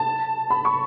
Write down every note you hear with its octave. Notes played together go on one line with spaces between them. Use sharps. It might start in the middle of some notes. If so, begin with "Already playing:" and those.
Already playing: A5
B5
C#6